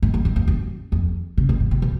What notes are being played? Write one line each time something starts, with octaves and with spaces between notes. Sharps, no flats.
G#2
F#2
F#2
F2
F#2
F2
C#3
A2
G#2
B2
B2